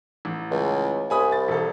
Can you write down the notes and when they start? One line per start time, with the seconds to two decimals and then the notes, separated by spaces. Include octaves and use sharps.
0.25 A1
0.51 C#2
1.10 C2 G#5 B5 D#6
1.32 A6
1.48 E1 A4